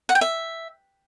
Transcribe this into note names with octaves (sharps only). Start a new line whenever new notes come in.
F#5
G5
E5